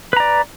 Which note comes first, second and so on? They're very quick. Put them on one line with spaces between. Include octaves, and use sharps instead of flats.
B4 A#5 D5